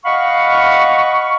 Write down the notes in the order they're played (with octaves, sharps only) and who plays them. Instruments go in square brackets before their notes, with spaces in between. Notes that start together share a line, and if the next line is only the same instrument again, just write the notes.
[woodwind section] D#5 F5 F#5 B5 C#6